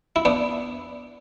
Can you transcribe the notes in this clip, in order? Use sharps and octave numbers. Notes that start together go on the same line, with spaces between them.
E4
B3 D4